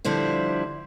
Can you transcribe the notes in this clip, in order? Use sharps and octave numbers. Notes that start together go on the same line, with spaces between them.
D3 F3 G3 E4 C5